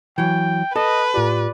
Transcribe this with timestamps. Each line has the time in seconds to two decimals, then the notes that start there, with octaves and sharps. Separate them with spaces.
0.18 E3 F#3 G5
0.76 A4 B4 D#5
1.14 A2 F4 G4 D5